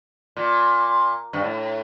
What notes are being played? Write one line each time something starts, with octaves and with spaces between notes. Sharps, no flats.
A#2
G2
A2